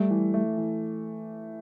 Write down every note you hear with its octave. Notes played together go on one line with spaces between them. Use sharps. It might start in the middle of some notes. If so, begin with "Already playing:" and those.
Already playing: G3 A3
E3
A3
E3